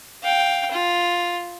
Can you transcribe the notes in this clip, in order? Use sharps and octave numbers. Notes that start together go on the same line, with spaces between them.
F5 G5
F4